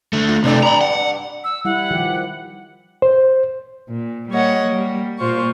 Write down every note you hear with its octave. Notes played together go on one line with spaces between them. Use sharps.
D3 A3
F4
G2 C3 A3 D4 D5
A#5 B5
F#5
E6
G3 E4 F#5
D#3 F3 G4
C5
A#2
G3 A#3 C#5 D#5 F#5
G3 A#3
A#2 A#3 F4 C5 C#6